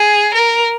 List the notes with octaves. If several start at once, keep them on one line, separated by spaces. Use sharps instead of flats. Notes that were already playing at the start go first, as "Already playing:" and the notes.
Already playing: G#4
A#4